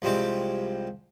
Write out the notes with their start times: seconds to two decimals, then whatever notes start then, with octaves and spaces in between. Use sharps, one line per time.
0.02 C2 F3 G3 G#3 C4 D6